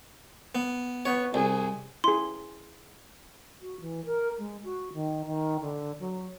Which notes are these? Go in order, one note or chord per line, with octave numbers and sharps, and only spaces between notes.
B3
B3 C#5
C2 G#4
E4 G#4 C6
F#4
E3
A#4
G#3
F#4
D#3
D#3
D3
F#3